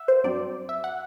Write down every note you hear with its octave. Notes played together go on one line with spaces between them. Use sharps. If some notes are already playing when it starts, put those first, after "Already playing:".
Already playing: E5 F#5
C5
G2 F#3 C4 D5
E5
F#5